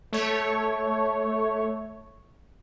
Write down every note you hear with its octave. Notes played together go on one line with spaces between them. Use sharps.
A3 C#5